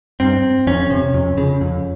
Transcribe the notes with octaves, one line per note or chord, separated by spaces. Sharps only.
G2 C4
F2 C#4
C3
F2
C#3
F2